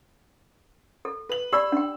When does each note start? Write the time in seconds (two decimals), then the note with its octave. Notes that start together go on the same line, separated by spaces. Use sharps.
1.05 A4
1.29 B4 F#7
1.53 G4 D5 B5 E6
1.72 D4 G5